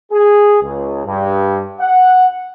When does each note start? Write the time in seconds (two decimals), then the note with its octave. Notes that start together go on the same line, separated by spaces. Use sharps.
0.11 G#4
0.62 C#2
1.05 G2
1.80 F#5